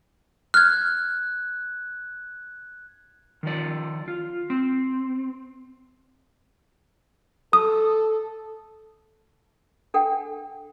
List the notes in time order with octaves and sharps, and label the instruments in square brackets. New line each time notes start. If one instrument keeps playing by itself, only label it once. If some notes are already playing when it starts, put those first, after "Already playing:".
[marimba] F6 [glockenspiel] F#6 G#6
[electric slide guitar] D#3 F3 D5
F4
C4
[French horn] A4 [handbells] D#6
[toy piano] D4 A4 F#5 G5